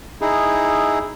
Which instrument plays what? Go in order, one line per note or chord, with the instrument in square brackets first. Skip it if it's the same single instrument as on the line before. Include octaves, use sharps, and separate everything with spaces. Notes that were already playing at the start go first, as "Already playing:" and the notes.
[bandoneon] D#4 E4 G#4